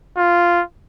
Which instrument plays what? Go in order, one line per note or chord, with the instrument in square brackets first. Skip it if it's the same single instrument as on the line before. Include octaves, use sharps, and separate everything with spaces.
[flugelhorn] F4